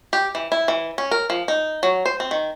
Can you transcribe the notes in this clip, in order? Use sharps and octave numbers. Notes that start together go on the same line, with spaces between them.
G4
E3
E4
E3
C#4
A#4
F3
D#4
F#3
C5
C4
D#3